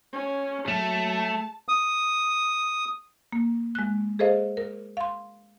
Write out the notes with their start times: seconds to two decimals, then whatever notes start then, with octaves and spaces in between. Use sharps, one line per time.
0.13 C#4
0.68 F#3 A3 A5
1.69 D#6
3.32 A#3
3.75 G#3 F#6
4.19 G#4 A4 C5 D#5 F5
4.57 A#4
4.97 F5 C6